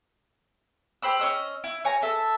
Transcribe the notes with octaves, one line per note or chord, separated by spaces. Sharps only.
G4 C5 B5 E6
C#4 D#5 E6
E4
C#5 G#5 A#5
A4 E5